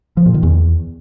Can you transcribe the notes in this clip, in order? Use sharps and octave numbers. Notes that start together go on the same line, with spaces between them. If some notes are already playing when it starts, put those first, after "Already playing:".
F3
A#2
D#3
E2